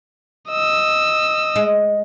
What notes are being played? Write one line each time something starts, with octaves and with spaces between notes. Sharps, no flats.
D#5 E6
G#3